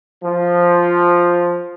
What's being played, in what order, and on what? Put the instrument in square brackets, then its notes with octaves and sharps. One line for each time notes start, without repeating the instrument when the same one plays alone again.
[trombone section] F3